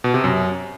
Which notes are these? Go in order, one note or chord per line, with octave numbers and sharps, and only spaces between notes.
B2
C3
F#2